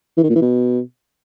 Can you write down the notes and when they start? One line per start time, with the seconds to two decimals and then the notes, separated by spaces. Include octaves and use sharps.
0.17 E3
0.23 D#3
0.29 A#2
0.35 E3
0.41 B2